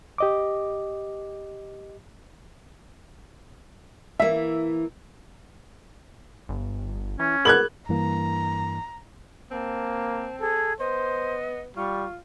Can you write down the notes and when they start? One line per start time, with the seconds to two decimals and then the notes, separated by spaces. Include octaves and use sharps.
0.18 G4 D#5 D6
4.20 E3 A#3 E5
6.49 G1
7.19 E3 C#4
7.45 B3 G#4 A#4 B5 F#6 G#6 F#7
7.89 G2 E3 A#3 A#5
9.51 A#3 C4 A5
10.41 G#4 A4
10.80 B3 C5 D#5
11.77 G3 F4 C#6